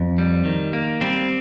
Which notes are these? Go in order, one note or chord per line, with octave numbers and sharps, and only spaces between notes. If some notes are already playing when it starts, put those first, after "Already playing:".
Already playing: F2
G3
D#3
A#3
G3 C4